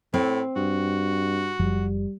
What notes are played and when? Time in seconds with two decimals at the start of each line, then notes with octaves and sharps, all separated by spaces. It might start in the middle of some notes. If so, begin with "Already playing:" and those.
0.14 A2 C4
0.56 G2 F#4
1.59 F#1 F#2 F3 G3